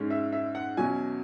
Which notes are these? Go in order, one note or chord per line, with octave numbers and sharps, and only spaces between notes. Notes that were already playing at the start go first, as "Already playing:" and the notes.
Already playing: G#2 G#3 C#4
E5
E5
F#5
E2 B2 F#3 C#4 G#5